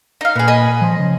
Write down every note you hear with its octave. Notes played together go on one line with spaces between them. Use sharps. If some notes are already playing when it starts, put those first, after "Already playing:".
D#4 F5
A#2 B3 G#4
D#5 G#5 B5
F3 C6
C#3